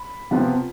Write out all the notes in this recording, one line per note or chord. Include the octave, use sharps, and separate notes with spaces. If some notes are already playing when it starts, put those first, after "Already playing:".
Already playing: B5
C3 F3 B3 F4